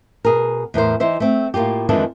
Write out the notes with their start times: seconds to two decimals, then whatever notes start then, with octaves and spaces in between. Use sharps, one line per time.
0.25 B2 G#4 A#4
0.74 E2 A2 A#4 C5
1.00 E3 D#4 C5 E5
1.20 A3 C4
1.54 A2 A#3 F4 G4
1.89 F2 D#3 E3 G#3 D4 A4